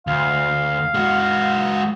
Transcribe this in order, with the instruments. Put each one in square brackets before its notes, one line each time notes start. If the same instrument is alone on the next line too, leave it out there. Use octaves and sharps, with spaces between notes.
[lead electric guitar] D2 [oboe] F5
[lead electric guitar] G#3 F#4